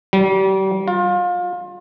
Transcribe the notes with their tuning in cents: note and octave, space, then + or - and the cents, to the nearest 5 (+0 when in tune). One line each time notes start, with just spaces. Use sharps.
G3 -35
F4 +30